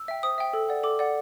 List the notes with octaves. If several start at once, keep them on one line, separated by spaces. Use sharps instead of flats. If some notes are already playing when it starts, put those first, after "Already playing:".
Already playing: E6
E5 G5
C5 D#6
E5 G5
A4
D5 F#5
A4 D6
D5 F#5